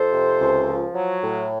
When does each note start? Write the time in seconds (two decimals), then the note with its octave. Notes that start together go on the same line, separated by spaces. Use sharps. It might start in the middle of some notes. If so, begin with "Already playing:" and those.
Already playing: F2 A4 C5
0.13 C3
0.41 C#2
0.68 F3
0.95 F#3
1.22 A2